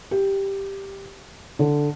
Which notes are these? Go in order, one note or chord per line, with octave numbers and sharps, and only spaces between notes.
G4
D3